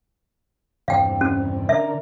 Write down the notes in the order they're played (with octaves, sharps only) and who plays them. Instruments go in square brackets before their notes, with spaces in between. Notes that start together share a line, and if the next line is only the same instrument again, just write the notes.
[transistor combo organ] E2 G2 C3 [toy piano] F5 G5
[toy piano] C#4
[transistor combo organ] D3 A#4 [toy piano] E5